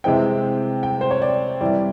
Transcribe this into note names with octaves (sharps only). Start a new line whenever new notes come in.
C3 E3 G#3 C4 G5
G5
C5
C#5
D5
C3 E3 G3 D5